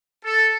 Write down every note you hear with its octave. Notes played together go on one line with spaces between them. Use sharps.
A4